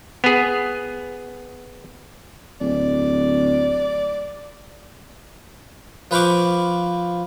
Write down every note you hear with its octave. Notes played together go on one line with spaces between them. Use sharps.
B3 G#4
D1 D5
F3 B4 C5 F5 C#6 D6